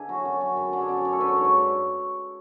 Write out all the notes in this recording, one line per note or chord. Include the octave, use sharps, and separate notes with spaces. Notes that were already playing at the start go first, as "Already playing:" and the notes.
Already playing: D3 D4 E4 G#4 B4
F#3 F#4
F#2
F#2
F#2
D3 D4
G#4
F#2 D5
C#5
F#2
A4
D3 B4
C#5
G#2 D5
C#5